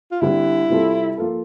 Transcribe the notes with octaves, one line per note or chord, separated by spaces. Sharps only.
F4
D3 G3 C4 E4
C3 G3 C4 F4 A4
F3 A#3 F4 A4